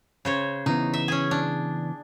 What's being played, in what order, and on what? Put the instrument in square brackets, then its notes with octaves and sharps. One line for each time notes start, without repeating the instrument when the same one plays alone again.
[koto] C#3 C5 C#5
[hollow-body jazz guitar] C#3 E3 B3 [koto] D#4
[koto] E5
C#4 G#4
D4